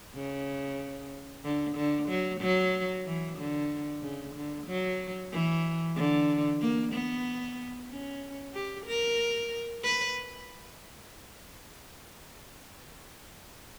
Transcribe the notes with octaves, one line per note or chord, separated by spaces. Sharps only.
C#3
D3
D3
F#3
F#3
E3
D3
C#3
D3
F#3
E3
D3
A#3
B3
C#4
G4
A#4
B4